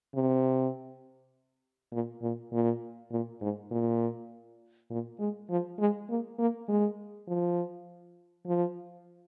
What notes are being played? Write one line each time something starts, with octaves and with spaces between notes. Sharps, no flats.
C3
A#2
A#2
A#2
A#2
G#2
A#2
A#2
G#3
F3
G#3
A#3
A#3
G#3
F3
F3